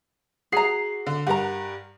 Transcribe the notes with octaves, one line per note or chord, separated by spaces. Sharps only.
F#4 G#4 A#5 C7
D3
G2 A#4 F#5 A#5